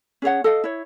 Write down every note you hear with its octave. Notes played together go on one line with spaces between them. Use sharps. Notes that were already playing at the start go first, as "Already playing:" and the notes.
C#4 G#4 C#5 F#5
A4 D#5 F5
E4 C#5